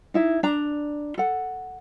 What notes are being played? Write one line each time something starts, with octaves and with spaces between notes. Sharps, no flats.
D#4 E4 E5
D4 A#5
A4 F#5